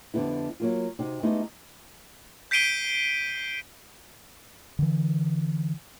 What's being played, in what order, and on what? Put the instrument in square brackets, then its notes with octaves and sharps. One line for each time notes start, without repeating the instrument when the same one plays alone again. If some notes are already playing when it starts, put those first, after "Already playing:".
[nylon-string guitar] F2 D3 G3 B3 E4
F#3 A#3 F4
C3 D#4 F#4
G#3 A3 B3 D#4 E4 G4
[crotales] G6 B6 C7 D7 D#7 G7
[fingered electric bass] D3 E3